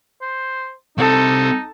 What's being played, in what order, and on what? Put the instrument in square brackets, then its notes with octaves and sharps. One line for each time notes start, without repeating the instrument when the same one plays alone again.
[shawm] C5
[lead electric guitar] C2 C4 [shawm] D#4 [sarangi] A4